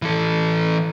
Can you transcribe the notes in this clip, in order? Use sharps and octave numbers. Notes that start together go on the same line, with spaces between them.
E3 A4